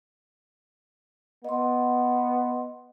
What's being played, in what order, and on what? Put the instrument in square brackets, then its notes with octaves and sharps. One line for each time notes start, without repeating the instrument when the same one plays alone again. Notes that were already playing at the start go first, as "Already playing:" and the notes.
[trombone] B3 [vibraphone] D#5 C6